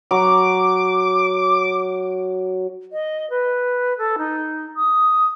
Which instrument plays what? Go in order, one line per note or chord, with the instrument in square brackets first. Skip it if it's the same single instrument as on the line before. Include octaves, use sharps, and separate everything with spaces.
[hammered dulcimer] F#3 [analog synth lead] D6
[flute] D#5
B4
A4
D#4
D#6